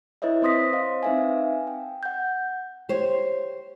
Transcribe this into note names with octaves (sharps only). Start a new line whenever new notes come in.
E4 B4 C#5 D#5 E5
C4 C5 C6 D#6 A#6 B6
C5 D#5 F5
C4 D#4 B4 E5 F5 G#5
G5
F#5 G6
G4 C5 C#5